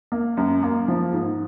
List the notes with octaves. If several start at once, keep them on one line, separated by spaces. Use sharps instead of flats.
A#3
F#2
A#3
F3
G#2